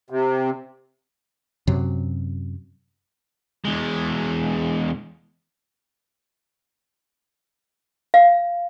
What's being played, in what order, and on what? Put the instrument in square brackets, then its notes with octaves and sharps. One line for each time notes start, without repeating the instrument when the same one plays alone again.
[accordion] C3
[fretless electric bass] F#2 C3 F#3
[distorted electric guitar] E2 G#3
[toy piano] F5